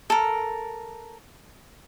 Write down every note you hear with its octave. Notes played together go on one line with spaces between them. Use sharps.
A4 A#4